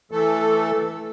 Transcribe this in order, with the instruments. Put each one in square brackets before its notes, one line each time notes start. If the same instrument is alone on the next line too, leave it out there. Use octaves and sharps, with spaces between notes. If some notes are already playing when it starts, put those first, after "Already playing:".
[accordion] E3 A3 A4